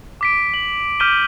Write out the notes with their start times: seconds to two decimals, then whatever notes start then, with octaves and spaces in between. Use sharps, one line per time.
0.21 D6 B6 D7
0.54 F#7
1.00 D6 F6 G6 B6 D#7 G7